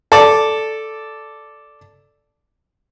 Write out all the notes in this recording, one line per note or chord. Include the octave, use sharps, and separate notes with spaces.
A4 D5